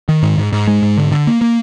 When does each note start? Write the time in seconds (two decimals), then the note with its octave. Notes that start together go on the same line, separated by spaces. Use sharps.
0.09 D#3
0.23 G#2
0.38 G#2
0.53 G#2
0.67 G#3
0.82 G#2
0.97 D3
1.12 D3
1.27 A#3
1.41 A#3